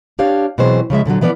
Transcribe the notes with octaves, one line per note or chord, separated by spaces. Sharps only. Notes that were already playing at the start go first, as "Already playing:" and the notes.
D4 G4 C#5 F5
B2 E3 F#3 C4 G#4 C5
C#3 F3 G#3 E5
A#2 D3 F3 F#3
E3 F3 B3 F4 D5